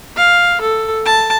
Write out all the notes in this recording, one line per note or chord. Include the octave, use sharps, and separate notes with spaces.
F5
A4
A5